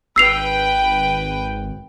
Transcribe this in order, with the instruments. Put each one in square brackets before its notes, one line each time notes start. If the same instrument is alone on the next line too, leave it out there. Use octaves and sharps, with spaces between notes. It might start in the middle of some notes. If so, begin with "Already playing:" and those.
[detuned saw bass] G#1 [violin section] B4 G5 [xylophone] E6 C7 F7